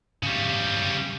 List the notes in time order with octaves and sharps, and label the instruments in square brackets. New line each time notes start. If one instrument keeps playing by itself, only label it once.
[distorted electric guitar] C#3 G3